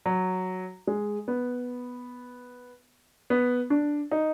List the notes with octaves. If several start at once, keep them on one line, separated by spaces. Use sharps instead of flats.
F#3
G#3
B3
B3
D4
D#4